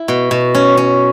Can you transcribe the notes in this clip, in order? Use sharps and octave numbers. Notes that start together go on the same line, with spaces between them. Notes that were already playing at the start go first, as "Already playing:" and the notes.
Already playing: E4
B2
B2
C#4
C#4